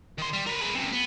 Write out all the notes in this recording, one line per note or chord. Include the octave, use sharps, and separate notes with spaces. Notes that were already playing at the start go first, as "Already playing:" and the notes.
D#3 C6
G3
A#4 B4
G#4 B4
F#2 C3
B3